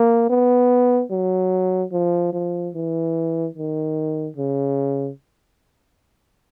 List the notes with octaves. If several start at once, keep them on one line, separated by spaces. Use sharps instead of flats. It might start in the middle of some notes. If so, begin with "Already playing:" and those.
Already playing: A#3
B3
F#3
F3
F3
E3
D#3
C#3